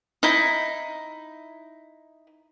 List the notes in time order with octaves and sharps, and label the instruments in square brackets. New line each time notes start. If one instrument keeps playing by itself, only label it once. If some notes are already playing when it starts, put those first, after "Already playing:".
[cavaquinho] D#4 E4